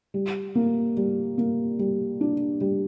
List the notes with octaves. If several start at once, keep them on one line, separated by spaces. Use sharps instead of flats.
G3
A#3
G3
A#3
G3
D4
G3